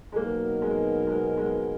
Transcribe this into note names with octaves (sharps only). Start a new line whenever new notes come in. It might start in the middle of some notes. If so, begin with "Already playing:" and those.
G#3
B2 F#3 A#3 B3 D#4 A#4
G#3
G#3
G#3